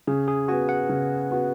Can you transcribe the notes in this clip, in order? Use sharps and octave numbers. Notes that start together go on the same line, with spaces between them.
C#3 G#4
G#4
B3 F#4 G#5
F#5
C#3
B3 F#4